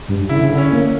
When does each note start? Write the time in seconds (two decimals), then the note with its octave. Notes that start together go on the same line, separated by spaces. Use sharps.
0.08 G2
0.29 C#3 E4
0.37 D3
0.44 C#3
0.51 D3
0.58 C#4
0.72 A#3